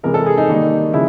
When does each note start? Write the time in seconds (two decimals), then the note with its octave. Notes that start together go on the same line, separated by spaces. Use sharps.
0.03 C3 E3 G#3 A#4
0.14 A4
0.26 G#4
0.38 D#4
0.49 D#3 G3 A#3
0.93 C#3 F3 G#3 E4